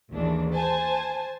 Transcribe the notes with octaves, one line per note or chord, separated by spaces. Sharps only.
A1 D#2 E3 G#3 D4
C5 G#5 A5